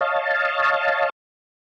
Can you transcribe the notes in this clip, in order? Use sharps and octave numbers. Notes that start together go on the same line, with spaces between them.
C#5 D#5 F5 A5